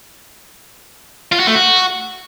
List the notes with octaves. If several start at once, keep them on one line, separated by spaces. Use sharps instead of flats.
F4
F#4
A3
F#4